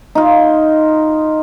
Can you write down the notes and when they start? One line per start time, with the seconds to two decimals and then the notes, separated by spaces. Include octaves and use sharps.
0.15 D#4 F4